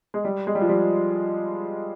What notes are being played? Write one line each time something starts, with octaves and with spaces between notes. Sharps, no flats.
G#3
G3
G#3
G3
F3
G3